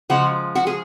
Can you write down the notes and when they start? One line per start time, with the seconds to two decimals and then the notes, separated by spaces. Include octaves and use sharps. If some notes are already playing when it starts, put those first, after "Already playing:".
0.09 C#3 F3 G#3 F#4
0.55 F#4
0.67 G#4